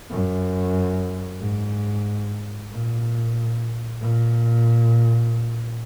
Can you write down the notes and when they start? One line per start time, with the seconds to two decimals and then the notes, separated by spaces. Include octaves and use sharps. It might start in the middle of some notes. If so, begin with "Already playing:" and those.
0.10 F#2
1.40 G#2
2.70 A#2
4.00 A#2